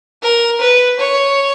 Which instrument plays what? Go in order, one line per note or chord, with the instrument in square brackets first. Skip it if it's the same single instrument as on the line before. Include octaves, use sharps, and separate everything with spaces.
[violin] A#4
B4
C#5